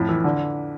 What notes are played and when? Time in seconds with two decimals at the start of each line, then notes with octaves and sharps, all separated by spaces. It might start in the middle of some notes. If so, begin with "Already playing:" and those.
Already playing: F2 A2
0.09 E3
0.24 D3